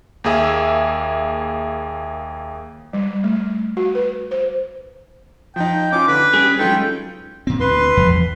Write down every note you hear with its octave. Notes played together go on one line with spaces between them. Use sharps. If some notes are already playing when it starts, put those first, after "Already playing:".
D#2 A#3 G#4 E5
G3
A3
F#4
B4
C5
F3 D#4 G5
C#4 D#4 F4 D6
D3 B4
G3 C#4 G4 G#4
F#3 G#3 C#4 D#4 F4 A4 G5
A#2 C4
D2 B4 C6
E2 F3